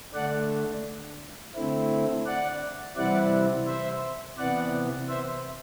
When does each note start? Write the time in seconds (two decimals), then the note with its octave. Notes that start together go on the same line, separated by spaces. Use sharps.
0.14 D3 A3 D4 D5 F#5
1.55 D3 A3 C4 E4
2.26 D5 F#5
2.97 C3 E3 G3 C4 E4 D5 F#5
3.67 C5 E5
4.38 C3 E3 B3 D5 F#5
5.09 C5 E5